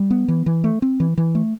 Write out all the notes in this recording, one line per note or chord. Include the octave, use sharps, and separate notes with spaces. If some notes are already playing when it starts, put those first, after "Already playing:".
Already playing: G3
B3
E3
E3
A3
C4
E3
E3
A3